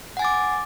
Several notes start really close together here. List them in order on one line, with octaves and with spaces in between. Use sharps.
F#5 G#5 A6 D6